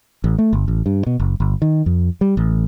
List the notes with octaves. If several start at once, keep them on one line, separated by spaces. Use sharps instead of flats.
A1
A3
G1
A1
G2
B2
F#1
G1
D#3
F2
G3
A1